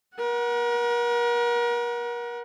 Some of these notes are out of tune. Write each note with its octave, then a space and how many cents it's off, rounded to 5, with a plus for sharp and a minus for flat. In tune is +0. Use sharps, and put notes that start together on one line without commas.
A#4 +35 F#5 +0